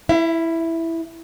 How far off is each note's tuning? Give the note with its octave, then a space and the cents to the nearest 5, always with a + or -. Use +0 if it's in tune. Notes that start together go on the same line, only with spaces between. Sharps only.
E4 +0 E5 +40